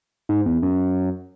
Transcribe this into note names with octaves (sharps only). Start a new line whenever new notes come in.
G#2
E2
F#2